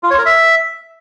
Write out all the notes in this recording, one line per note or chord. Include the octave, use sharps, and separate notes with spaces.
F4
C#5
A#4
E5